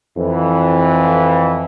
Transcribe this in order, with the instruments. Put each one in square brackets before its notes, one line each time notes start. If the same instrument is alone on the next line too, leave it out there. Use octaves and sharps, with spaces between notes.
[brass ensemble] F2 E3